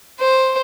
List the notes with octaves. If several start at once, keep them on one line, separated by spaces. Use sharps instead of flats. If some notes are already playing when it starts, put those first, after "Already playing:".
C5